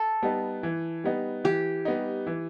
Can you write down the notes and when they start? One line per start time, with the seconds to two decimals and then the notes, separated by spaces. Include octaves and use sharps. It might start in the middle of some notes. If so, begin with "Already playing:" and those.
Already playing: A4
0.22 G3 B3 D#4
0.63 E3
1.04 G3 B3 D#4
1.44 E3 G4
1.85 G3 B3 D#4
2.27 E3